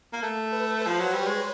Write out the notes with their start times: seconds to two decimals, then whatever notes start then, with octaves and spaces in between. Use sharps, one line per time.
0.13 A#3
0.23 A3
0.52 B4
0.80 C5
0.87 F3
1.00 F#3
1.10 G3 C#5
1.26 G#3